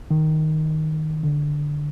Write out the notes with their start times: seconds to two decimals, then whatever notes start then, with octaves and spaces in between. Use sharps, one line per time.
0.11 D#3
1.23 D3